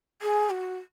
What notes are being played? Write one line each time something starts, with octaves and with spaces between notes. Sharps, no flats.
G#4
F#4